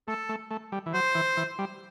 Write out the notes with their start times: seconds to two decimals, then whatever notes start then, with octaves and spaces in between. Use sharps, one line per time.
0.08 A3 A4
0.29 A3
0.51 A3
0.72 G3
0.86 E3
0.94 F#3 C5
1.15 E3
1.37 E3
1.59 G3